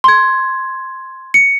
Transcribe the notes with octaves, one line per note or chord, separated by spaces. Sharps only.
C6 G#6
C#7